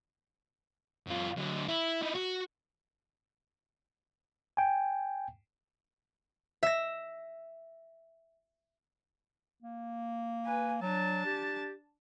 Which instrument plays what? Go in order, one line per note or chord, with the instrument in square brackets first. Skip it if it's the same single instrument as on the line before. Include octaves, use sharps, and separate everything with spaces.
[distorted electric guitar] F#2 F4
D3 F#3
E4
D#4 E4
F#4
[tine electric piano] G5 G#5
[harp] E5 A#6
[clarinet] A#3
[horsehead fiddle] B4 G#5
[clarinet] F#3 [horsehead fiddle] D4 A5
[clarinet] G4